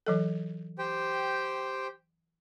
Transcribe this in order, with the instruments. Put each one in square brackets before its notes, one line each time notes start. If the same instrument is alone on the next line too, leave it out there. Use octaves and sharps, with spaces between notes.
[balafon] E3 F#3 A4
[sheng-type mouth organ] G4 C5 G5